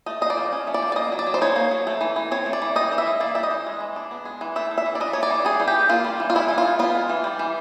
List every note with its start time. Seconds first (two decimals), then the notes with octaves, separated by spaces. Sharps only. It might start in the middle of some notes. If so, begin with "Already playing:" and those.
0.06 A3 D#5
0.21 F3 D#5
0.30 D5
0.37 F3
0.52 C#4
0.67 A3
0.74 D5
0.82 F3
0.92 D5
0.96 A#3 D#5
1.12 F#3
1.19 D5
1.27 F#3
1.34 C5
1.41 D#4 C#5
1.56 A#3
1.71 F#3
1.87 A3
2.01 E3
2.16 E3
2.31 C4 C#5
2.46 A3
2.53 D5
2.62 E3
2.76 G3 D#5
2.92 E3
2.98 E5
3.07 E3
3.20 A#3 D5
3.35 G3 E5
3.43 D#5
3.51 E3
3.66 G#3
3.80 E3
3.96 D4
4.11 B3
4.25 G#3
4.41 E3
4.56 A3 E5
4.71 E3
4.78 E5
4.86 E3
4.95 D5
5.00 D4 D#5
5.13 A3 C#5
5.23 D5
5.30 E3
5.45 G3 G#4
5.60 E3
5.68 G4
5.75 C#4
5.89 A#3 F4
6.04 G3
6.20 E3
6.30 F4
6.35 G#3 E4
6.48 E3 E4
6.58 F4
6.65 D#4
6.79 B3 F4
6.95 G#3
7.09 E3
7.24 G3
7.39 E3